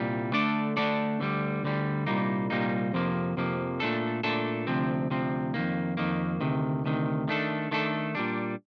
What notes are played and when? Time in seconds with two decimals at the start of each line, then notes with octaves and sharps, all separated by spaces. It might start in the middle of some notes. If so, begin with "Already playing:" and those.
Already playing: C2 A#2 G3
0.33 D3 A3 D4 A4 D5
0.77 D3 A3 D4 A4 D5
1.19 D2 D3 G3
1.63 D2 D3 G3
2.07 C2 A#2 G3 A#3 D#4
2.50 C2 A#2 G3 A#3 D#4
2.93 F2 C3 F3 A#3
3.37 F2 C3 F3 A#3
3.80 A#2 A3 D4 A4
4.23 A#2 A3 D4 A4
4.67 D2 C3 F3 C4
5.10 D2 C3 F3 C4
5.54 F2 D#3 A#3
5.97 F2 D#3 A#3
6.40 D2 C3 D#3
6.85 D2 C3 D#3
7.28 D#3 A3 D4 A4
7.71 D#3 A3 D4 A4
8.15 A#2 G3 D4